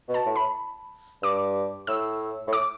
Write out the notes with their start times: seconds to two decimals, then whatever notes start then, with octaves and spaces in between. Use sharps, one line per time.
0.09 B2
0.14 A5
0.26 A2
0.36 B5
1.22 G2 D6
1.87 A2 E6
2.48 A2
2.53 D6